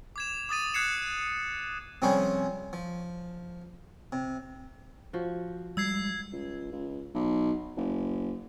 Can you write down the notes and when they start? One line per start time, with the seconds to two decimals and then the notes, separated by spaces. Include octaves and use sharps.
0.16 D6 G#6 E7
0.49 D6 D#6 A6 D#7
0.74 D#6 F#6 G#6 C7 C#7 E7
2.02 C3 F3 G3 C#4 G#4 C5
2.73 F3
4.12 C3
5.13 F3 F#4
5.77 G3 G#3 E6 G#6 C7
6.32 C#2
6.73 C#2
7.14 B1
7.77 F#1